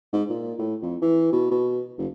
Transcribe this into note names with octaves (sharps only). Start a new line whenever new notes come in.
G#2
A#2
A2
F2
E3
B2
B2
F#1